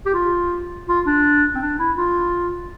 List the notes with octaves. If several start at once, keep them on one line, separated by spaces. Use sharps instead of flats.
G4
F4
F4
D4
C4
D4
E4
F4